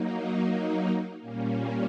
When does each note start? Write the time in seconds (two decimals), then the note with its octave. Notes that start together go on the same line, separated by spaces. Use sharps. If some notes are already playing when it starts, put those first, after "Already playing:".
Already playing: F#3 A#3 D#4
1.20 A#2 G3 A#3 C#4